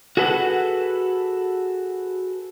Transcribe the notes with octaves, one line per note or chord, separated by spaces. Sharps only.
F#4 G#4 A4 B4 F5 F#5